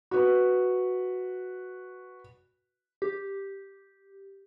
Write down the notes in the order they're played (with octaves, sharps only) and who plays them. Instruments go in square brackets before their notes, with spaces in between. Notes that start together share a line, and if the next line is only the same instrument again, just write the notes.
[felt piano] F#4 B4
[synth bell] G4